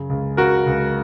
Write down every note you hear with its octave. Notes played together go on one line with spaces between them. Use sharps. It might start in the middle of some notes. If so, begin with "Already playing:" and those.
Already playing: F#2 C#3
C#2
C#3 F#4 A#4
C#2